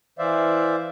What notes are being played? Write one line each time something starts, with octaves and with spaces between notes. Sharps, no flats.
E3 C5 D5 E5 F5